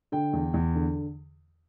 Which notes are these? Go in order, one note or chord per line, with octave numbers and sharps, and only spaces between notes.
D3 G5
E2
E2
D3